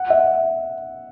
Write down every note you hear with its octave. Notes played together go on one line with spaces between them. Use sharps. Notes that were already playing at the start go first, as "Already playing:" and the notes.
Already playing: F#5
E5